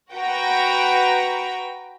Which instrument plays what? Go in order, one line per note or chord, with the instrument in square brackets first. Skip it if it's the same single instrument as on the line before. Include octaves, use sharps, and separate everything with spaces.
[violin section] F#4 B4 G5 A#5